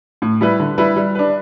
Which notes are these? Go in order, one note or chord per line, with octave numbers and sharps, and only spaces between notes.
A2
G3 E4 B4
D3
G3 E4 B4
G3
D4 B4